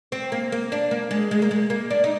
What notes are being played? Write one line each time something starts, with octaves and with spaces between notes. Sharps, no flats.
C4
A#3
A#3
D4
A#3
G#3
G#3
A#3
G#3
A#3
D4
D#4